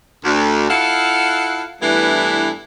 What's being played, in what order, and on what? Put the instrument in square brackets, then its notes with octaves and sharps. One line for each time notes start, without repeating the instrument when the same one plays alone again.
[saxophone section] D2
E4 F4 A4 F5 F#5
G2 E3 A3 B3 D4 E4